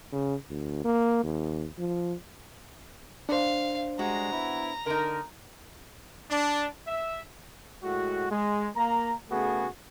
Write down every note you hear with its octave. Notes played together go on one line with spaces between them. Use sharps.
C#3
D2
A#3
D#2
F3
D4 C5 F5
G3 G#3 F#4 A#5
B3 E4 B5
D3 D#4 A#4
D4
E5
A2 G#3 F#4
G#3
A#3 A#5
C#3 A3 B3 F#4 G#4